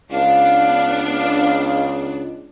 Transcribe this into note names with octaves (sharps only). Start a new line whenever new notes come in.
C#2 B3 D4 F5